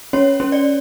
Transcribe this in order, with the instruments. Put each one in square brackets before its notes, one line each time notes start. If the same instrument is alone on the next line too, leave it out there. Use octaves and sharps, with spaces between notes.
[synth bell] C#4 C#5
C#4
D5